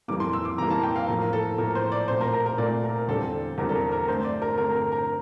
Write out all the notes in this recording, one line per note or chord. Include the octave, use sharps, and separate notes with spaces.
F2 E3 G3 A#3 D6
C6
E6
D6
F2 E3 G3 A#3 A#5
A5
G5
F5
A2 F3 A#3 A#4
A4
A2 F3 A#3 A#4
C5
D5
A#2 A3 C4 C5
A#4
A#4
A#4
A#2 A3 C4 D5
A#4
E2 D3 G3 C4 A4
E2 D3 G3 C4 A#4
A4
A#4
A#4
G2 D3 A3 C4 C5
D5
A#4
G2 D3 A3 C4 A#4
A#4
A#4